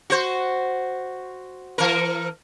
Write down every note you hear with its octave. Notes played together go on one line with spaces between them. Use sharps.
F#4 C5
E3 A#4